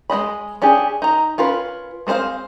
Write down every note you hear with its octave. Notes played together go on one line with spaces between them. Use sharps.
G#3 D#4 D#5 B5
C#4 D4 G4 G#4
D#4 A#5
C#4 F4 A#4 B4
G#3 C4 F#4 C5 F5